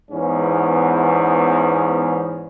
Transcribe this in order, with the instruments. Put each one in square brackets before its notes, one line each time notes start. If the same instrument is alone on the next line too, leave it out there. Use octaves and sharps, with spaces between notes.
[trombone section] E2 G#2 B3 C#4